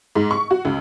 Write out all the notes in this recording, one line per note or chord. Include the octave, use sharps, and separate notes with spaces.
G#2
C#6
F#4
C#2